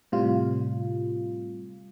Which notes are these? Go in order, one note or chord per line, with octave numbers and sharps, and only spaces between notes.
A2 C3 G3 F4